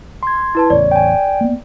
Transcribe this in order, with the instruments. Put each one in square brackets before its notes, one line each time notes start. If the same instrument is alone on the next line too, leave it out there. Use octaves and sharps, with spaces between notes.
[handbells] C6 G#6
[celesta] E4 B4 A5
[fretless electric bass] E2 A2 C#3 [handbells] C#5 [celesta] D5
[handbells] G5 G#5
[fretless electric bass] A#3 B3